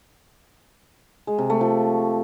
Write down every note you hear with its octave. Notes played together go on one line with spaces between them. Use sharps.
G#3
C3
A3
F3